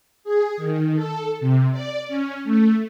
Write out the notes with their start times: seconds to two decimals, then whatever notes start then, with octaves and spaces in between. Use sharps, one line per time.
0.24 G#4
0.57 D#3
0.95 A4
1.40 C3
1.72 D5
2.08 C#4
2.44 A3